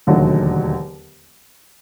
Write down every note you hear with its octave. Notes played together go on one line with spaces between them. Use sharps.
E1 D#2 D3 F#3 A3